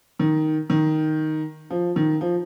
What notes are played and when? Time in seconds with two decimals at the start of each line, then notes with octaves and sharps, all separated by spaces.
0.19 D#3
0.70 D#3
1.70 F3
1.96 D#3
2.21 F3